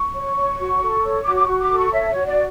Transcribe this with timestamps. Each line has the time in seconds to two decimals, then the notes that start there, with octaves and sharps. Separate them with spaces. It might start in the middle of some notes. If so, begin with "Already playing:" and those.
Already playing: C#6
0.14 C#5
0.36 C#5
0.59 F#4
0.82 A4
1.04 C#5
1.26 F#4 D6
1.36 D6
1.43 F#4 C#6
1.60 D6
1.71 A4
1.77 C#6
1.93 C#5 E5
2.10 C#5
2.15 F#4
2.27 D5